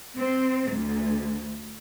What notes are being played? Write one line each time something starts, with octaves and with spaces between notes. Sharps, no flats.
C4
D2